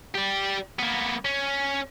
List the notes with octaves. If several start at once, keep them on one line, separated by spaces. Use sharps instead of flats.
G4 D5
A#3 B3
C#4